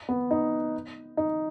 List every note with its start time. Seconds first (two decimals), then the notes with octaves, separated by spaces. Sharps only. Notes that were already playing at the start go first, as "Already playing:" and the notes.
0.09 B3
0.31 D#4
1.17 D#4